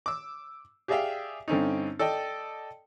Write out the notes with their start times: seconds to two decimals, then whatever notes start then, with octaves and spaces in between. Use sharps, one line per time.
0.06 D6 E6
0.88 G4 G#4 D5 E5 F5 G5
1.48 G2 D3 C4 C#4 D#4
1.99 A4 D5 D#5 G5